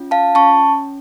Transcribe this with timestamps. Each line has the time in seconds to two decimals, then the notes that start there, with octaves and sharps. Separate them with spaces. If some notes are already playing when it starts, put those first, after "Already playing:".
Already playing: C#4 F4
0.11 F5 A5
0.35 C#4 A5 C#6